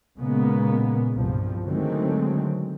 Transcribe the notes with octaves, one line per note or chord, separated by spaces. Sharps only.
A#2 C#3 G#3 A#3 B3
C2 G2 F3
D3 D#3 F#3 G#3 A3 C4